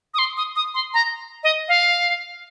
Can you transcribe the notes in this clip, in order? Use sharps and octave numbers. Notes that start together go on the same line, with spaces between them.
D#6
C6
D#6
D#6
C6
A#5
D#5
F5